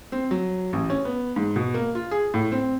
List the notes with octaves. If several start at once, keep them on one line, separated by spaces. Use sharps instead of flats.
C4
F#3
A1
C#4
B3
G#2
B2
A#3
F4
G#4
A2
C4